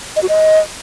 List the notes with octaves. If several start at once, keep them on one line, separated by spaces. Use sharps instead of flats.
D#5
F#4
D#5